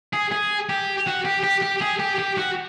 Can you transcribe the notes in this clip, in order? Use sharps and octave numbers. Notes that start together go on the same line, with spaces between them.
G#4
G#4
G4
F#4
G4
G4
G4
G#4
G4
G4
F#4